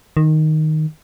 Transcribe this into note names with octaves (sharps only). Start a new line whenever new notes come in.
D#3